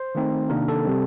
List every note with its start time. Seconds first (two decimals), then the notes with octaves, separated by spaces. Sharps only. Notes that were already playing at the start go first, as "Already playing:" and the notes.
Already playing: C5
0.15 D#3 A3 C4 D#4
0.50 C3 D#3 A#3 D4 A#4
0.68 A4
0.85 C3 G3 C4